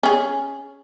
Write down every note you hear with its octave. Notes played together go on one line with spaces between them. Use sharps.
C#4 G#4